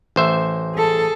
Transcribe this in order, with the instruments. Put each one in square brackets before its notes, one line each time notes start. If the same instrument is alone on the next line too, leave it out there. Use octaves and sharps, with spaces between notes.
[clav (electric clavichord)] A1 C5 E5
[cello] G#4 A4